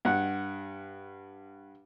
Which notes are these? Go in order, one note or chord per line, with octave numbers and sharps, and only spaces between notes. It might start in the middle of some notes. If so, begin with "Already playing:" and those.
G2 F#5